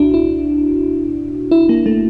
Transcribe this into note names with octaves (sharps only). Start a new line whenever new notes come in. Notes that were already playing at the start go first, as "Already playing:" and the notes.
Already playing: C2 A#2 D4 E4 F#4
E4
E4
A#3
A3